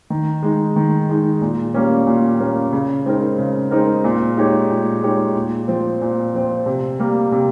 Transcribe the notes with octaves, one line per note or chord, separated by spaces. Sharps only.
D#3
G#3 D#4
D#3
G#3 D#4
A#2
G3 A#3 C#4
A#2
G3 A#3 C#4
C#3
G#3 C4 D#4 A#4
C#3
G#3 C4 D#4 A#4
A#2
G#3 D#4 G4 C#5
A#2
G#3 D#4 G4 C#5
A#2
F3 C4
A#2
F3 C4
C3
G3 A#3
C3